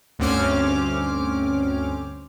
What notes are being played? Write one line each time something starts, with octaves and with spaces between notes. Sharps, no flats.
D2 G2 C4 C#4 D6 F6